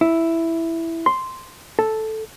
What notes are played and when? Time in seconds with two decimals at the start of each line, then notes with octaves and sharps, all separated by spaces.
0.01 E4
1.06 C6
1.79 A4